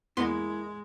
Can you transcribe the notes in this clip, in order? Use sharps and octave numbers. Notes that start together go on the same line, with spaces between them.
E2 G#3 A#3 B3 E4 C6